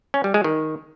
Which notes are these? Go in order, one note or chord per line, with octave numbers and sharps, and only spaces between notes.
C#4
G3
G#3
D#3